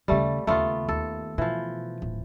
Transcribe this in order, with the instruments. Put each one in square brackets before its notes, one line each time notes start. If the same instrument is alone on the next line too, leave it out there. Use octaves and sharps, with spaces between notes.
[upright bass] D#2 C#3 [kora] G3 A3
[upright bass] D#2 C#3 [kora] A3 B3 F4
[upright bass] D#2 [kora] A4
[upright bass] B2 [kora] E3 F3
[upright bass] D1